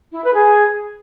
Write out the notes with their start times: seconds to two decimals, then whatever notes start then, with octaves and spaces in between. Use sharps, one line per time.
0.13 E4
0.24 B4
0.35 G#4